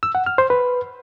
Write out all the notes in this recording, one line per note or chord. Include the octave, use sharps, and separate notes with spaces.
E6
F#5
F6
C5
B4